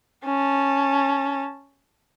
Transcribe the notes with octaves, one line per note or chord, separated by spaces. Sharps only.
C#4 A5